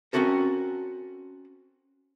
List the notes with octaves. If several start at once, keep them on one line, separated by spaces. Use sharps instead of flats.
C4 C#4 F#4 A4 A#4